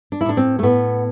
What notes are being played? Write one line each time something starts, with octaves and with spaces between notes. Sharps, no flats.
D4
E4
A2 D4
C4
A3
A2 B3